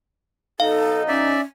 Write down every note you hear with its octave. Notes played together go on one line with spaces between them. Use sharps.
B1 D#4 A4 F5
C#4 D5 E5